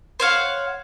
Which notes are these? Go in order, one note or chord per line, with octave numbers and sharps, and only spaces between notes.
C5 C#5 F5 F#5